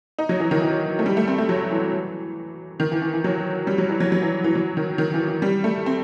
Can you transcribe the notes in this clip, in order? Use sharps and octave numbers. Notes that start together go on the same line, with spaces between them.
D#4
F#3
E3
D#3
E3
A3
G3
A3
C4
A3
F#3
E3
D#3
E3
E3
E3
F#3
G3
F#3
E3
F#3
F#3
E3
E3
F#3
D#3
D#3
E3
E3
G3
A3
C4